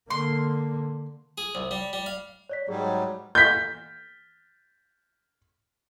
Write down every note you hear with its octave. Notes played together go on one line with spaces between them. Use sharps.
D3 A#3 C6
G#4
C2
G3
G3
F5
C#5 D5 B6
G#2 F#3 G3 G#4
G6 B6